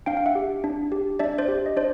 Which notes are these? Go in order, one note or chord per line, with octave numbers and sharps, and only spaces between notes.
D4 F5 G5
F5
E5 F#5
G4
D4
G4
D4 D5 E5
C5 D5
G4
D#5
D4 C5 D5